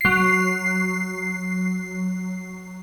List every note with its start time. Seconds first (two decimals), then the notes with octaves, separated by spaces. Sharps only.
0.01 F#3 C7